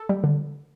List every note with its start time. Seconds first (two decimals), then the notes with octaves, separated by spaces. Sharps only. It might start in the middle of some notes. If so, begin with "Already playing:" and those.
Already playing: A4
0.09 G3
0.24 D3